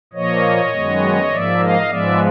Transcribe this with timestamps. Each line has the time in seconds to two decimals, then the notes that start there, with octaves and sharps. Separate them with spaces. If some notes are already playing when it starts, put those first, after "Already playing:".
0.13 A#2 F3 A#3 C#5 D#5
0.72 F#2 D#3 G#3 B3
1.30 G#2 F3 A#3 D5 E5
1.60 D#5 F5
1.89 G#2 F3 G#3 B3 D5 E5